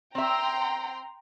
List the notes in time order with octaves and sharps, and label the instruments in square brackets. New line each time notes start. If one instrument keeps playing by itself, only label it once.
[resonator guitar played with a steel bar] C4 E5 [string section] G5 A#5 C6